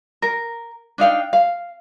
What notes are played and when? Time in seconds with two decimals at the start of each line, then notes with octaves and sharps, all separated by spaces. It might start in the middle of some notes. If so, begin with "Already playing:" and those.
0.22 A#4
0.98 D4 D#4 F5 G5
1.33 F5